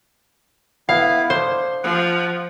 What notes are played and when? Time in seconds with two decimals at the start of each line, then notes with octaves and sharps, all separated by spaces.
0.89 B3 E4 F5
1.30 D4 C5
1.83 F3 F#5